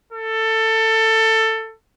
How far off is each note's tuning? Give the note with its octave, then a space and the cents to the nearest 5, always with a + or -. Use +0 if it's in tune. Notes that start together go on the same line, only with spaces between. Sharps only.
A4 +20